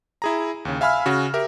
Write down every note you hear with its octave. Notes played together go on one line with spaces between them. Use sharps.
E4 G#4 A#5
D#2 C#3
E5 F5 G#5 B5 E6 F6
C#3 F#4
G4 A#4 E5